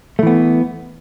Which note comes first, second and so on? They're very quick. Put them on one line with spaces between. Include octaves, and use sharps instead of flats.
A3 E3 B3